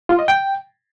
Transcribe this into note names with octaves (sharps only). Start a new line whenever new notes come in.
F4
D#5
G5